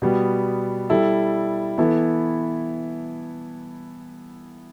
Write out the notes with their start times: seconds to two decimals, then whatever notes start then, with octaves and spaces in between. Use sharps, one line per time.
0.02 B2 G3 B3
0.90 G3 E4 A4
1.78 E3 B3 E4 A4